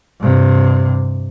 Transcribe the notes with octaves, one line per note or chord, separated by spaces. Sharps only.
G2 C3